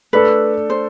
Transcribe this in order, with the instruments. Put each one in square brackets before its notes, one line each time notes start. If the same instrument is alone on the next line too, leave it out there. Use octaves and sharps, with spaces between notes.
[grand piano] A3 D4 A4 [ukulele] B4
[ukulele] C5